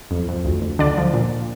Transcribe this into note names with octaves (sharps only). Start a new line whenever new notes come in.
F2
F2
D2
D2
D3 D4 D5
F3
A#2